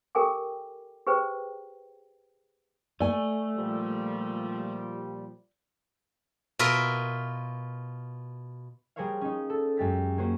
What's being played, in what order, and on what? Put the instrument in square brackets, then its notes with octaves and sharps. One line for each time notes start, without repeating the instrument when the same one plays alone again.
[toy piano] G4 A4 A#4 G5 G#5 D6
G4 G#4 B4 C5 G5
[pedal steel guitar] A3 [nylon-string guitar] D5 G#5
[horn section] A#2 F3 G3
[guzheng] B2 F4 A#4 E5
[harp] G3 G#4 A#4 C5 C#5 F5
C#4 D#4
A4
F#2 G#3 G4 A6 B6
A#3 C#4 F#4 C5